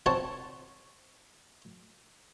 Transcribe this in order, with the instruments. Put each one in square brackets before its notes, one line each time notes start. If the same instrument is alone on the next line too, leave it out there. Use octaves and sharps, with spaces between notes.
[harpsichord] C4 F#4 C#5 A5